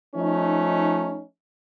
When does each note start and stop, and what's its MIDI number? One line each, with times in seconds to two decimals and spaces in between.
0.15 1.22 53
0.15 1.22 57
0.15 1.22 61
0.15 1.22 63